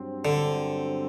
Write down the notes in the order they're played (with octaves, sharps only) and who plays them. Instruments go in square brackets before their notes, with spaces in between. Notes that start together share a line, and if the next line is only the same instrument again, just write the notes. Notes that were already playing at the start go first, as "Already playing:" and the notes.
Already playing: [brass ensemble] G2 F#3 C4
[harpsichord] D3